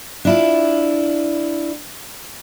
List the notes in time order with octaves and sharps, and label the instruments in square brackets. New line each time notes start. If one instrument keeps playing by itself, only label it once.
[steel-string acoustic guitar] D4 E4 F4